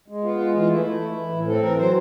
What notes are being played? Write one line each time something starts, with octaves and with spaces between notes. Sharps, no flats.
G#3
B3 F4
G#3
E3 F4
A3 E4
A3
E3
E3
A2
C4 A4
E3 A#4
F#3 C5